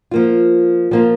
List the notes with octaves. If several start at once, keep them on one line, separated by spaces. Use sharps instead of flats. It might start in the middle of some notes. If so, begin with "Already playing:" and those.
F3 A#3 F4
F3 A#3 F4